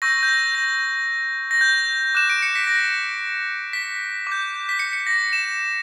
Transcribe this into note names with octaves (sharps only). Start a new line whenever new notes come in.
C#6 E6 G6 A#6
G6
A#6
A#6
A#6
G6
D6 F#6 E7
D7
C#7
B6
A#6
B6
D6 G6
B6
C#7
C#7
A#6
E7